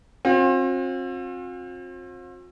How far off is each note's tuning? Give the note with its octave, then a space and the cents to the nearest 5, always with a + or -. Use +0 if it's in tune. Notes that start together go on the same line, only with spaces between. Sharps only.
C4 +35 F4 +45